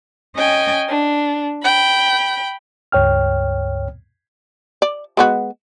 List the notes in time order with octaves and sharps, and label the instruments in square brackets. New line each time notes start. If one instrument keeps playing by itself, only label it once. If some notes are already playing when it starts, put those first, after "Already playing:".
[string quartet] C#4 D#5 G5 G#5
D4
G5 B5
[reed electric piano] C#2 G2 C#5 G5 F6
[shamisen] D5
G#3 B3 F#4